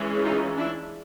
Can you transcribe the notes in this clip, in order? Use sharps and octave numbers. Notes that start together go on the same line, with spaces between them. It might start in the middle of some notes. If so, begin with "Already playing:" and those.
Already playing: E3 G#3 C#4
D#4 F4
D4 E4